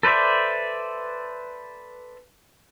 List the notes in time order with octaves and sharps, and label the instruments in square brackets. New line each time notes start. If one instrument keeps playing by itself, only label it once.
[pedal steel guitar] A4 B4 C5 D5 E5